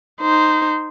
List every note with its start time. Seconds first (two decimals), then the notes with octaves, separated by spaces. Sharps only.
0.21 D#4 C5